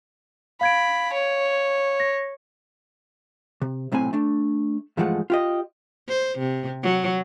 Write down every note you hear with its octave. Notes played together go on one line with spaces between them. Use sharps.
F5 B5 G#6 D7
C#5
A#6
C3
B1 A2 C3 C4 G#5
A3 D4
G2 E3 F3 G#3 A3 F#5
F4 G4 D#5
C5
C3
F#3